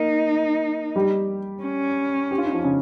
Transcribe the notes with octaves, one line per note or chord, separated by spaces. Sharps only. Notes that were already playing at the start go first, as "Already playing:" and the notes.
Already playing: A#3 D#4
G3 G4
C#4
G4
F4
D#4
F3 F4
C#3 C#4